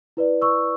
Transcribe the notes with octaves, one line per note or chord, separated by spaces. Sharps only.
E4 B4 D5
C#6 E6